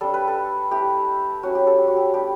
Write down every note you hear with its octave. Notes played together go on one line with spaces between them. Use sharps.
G3 D4 A4
B4
A4
A3 E4 G4
F#3 C#4 E4 F#4
G4
A4
G4
F#4
G4
F#4
G3 B3 D4 G4